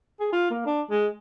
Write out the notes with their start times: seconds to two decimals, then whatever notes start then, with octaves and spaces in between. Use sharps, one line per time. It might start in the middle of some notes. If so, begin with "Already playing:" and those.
0.20 G#4
0.33 F4
0.51 A#3
0.66 D4
0.90 G#3